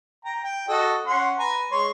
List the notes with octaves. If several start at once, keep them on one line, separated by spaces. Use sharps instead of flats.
G5 A#5
G5
F#4 A4 D#5
C#4 F#5 C6
B4 G#5 A#5
G#3 C#5 C6